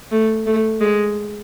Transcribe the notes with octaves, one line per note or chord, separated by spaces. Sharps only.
A3
A3
G#3